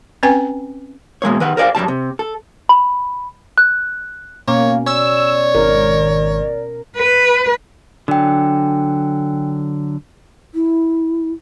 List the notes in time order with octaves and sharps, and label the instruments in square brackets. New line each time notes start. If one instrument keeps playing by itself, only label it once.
[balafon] C4 C#4 B4 G5 G#5
[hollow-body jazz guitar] B2 G#3 A#3 C#5
D#3 B4 F#5
A#4 C5 D5 F5
F#2 F3 G3 A5
C3
A4
[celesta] B5
F#6
[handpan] B2 C#4 [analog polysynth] A#3 [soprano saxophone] C#5
[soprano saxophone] C#5 [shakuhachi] D5 [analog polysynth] E6
[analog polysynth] G#1 [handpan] A#4
[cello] B4
[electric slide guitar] D3 F#3 [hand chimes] D4 G5
[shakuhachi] E4